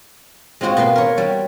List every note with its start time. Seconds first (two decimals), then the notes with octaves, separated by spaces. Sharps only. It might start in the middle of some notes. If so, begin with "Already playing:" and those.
0.61 G#3 C4 F4 F#4 C5
0.77 B2 A#3 B4 C6
0.96 A#4 C#5
1.17 G3 F#4